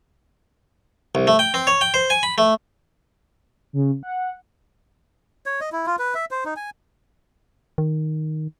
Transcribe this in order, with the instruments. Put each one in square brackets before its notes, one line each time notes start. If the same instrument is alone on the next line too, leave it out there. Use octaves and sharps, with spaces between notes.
[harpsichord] C2
A3
G5
C4
C#5
G5
C5
G#5
B5
A3
[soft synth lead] C#3
F#5
[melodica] C#5
D#5
E4
F4
B4
E5
C5
D#4
G#5
[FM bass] D#3